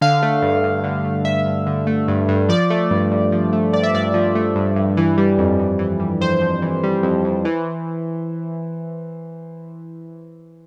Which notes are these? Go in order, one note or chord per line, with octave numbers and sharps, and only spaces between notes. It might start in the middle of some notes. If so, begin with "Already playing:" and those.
D3 F5
A3
G2
G2
D3
A3
G2 E5
G2
D3
A3
G2
G2
F3 D5
A3
G2
G2
F3
A3
G2 D5
E5
G2 D5
F3
A3
G2
G2
E3
G3
F2
F2
E3
G3
F2 C5
F2
E3
G3
F2
F2
E3